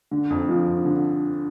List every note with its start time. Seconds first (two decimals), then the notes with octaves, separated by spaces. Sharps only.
0.11 D3
0.30 F2
0.49 F3
0.67 F2
0.85 D3